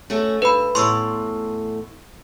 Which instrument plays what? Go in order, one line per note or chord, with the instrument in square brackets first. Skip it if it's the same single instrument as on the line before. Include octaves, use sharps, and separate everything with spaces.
[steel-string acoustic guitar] A3 C#4 F#4
[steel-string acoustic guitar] G2 [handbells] B4 B5
[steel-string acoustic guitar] E2 A2 [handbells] C6 C#6 E6